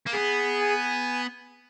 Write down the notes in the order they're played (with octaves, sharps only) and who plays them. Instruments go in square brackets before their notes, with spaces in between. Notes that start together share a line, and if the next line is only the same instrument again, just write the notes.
[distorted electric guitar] A#3
[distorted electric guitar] B3 [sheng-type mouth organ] G#4
[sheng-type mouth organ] G#5